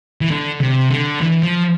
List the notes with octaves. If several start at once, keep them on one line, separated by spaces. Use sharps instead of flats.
E3
D3
C3
D3
E3
F3